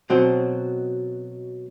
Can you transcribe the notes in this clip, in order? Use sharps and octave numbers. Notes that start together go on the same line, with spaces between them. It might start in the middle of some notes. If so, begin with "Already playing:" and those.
B2 F#3 C4